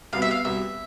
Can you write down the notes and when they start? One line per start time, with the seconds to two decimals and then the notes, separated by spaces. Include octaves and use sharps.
0.13 C2 B2 B3 F5
0.22 E5
0.31 F5
0.45 C2 B2 B3 E5